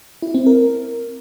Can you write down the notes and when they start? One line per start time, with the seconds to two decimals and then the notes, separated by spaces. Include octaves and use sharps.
0.22 E4
0.34 C4
0.46 A#4